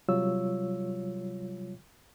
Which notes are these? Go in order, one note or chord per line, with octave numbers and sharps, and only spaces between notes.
C3 F#3 G3 F4 C#5 E6